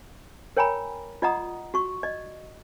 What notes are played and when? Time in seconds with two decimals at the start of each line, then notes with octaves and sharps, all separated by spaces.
0.57 A#4 C#5 G5 G#5 A#5 B5
1.22 F4 D5 D#5 F#5 A#5 D#6
1.74 F#4 C#6
2.03 D5 D#5